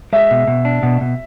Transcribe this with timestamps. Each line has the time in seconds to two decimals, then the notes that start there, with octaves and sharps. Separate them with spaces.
0.13 G#3 E5
0.31 B2
0.48 B2
0.65 D4
0.83 B2
1.01 B2